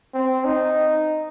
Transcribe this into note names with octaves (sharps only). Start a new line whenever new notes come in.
C4
D#4